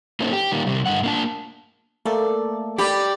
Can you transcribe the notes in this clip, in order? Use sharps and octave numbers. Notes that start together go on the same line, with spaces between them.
A#3 C#4 D#4 A4 C5
G4
D#3 G3 A#3
C3 G3
G2 D3 F3 F#5
A#3 D4 A5
A3 A#3 A4 D5
D#4 G4 D5 B5 D6